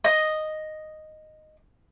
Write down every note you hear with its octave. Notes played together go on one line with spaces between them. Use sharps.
D#5 D#6